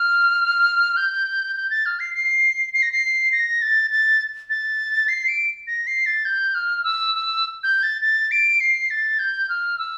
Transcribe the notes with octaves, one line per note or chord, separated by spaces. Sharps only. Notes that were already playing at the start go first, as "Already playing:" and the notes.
Already playing: F6
G6
G6
A6
F6
C7
C7
C7
A#6
C7
A#6
A6
A6
A6
C7
D7
A#6
C7
A6
G6
F6
E6
E6
G6
A6
A6
D7
C7
A6
G6
F6
E6